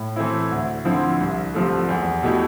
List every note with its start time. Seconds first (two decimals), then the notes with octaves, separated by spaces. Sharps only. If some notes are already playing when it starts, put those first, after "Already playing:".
Already playing: A2
0.16 E3 A3 C4 E4
0.51 D2
0.85 D3 F3 C4 E4
1.20 C2
1.54 C3 F3 A3
1.89 E2
2.23 B2 A3 E4 G4